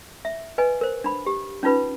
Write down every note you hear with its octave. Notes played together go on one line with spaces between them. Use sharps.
E5
B4 D#5 G#5
A#4 C5
D4 B5
G4
C#4 D#4 F4 B4 B5